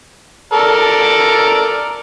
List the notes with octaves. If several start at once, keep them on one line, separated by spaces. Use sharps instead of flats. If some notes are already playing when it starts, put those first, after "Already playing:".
A4 A#4 D5